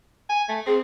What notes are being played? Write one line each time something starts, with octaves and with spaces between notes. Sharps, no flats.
G#5
A3
C4 G#4